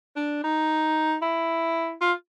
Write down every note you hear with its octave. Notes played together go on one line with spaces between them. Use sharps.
D4
D#4
E4
F4